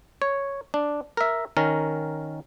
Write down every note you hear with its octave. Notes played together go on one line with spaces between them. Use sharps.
C#5
D4
A#4 E5
D#3 C#4 A#4